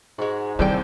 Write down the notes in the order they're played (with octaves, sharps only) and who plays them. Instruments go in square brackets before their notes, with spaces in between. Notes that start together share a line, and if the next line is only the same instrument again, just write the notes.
[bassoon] G#2 [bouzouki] G#3 F#4
[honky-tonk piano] D#2 A2 C3 [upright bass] G3 [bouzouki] C5 D5 G5